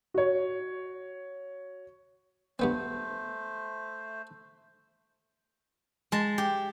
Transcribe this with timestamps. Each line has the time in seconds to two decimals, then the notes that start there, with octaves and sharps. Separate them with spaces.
0.14 F#4 C#5
2.59 G2 A3 B3 C4 C5
6.12 G#3 A5
6.38 G4